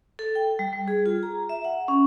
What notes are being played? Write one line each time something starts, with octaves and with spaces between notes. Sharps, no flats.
A4
G5
G3
G3
G#4
F4
A#5
E5
F#5
C#4